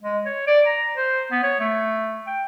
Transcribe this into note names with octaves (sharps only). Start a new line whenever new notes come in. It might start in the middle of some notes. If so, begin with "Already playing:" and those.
G#3
C#5
D5
A#5
C5
B3
C#5
A3
G5